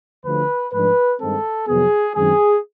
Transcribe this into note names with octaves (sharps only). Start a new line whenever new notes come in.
D2 D3 F3 B4
G#2 F3 A3 D4 B4
G2 D#3 G#3 C4 A4
F2 C3 D#3 F#3 B3 G#4
F#2 D#3 G#3 C4 G#4